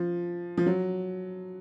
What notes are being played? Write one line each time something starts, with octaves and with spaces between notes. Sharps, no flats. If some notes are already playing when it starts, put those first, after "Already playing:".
Already playing: F3
F3
F#3